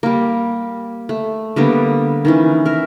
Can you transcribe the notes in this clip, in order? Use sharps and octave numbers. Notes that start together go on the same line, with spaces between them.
G3 A#3
A3
D3 G3 A#3 B3
D#3 E3 C#4
A#4 E5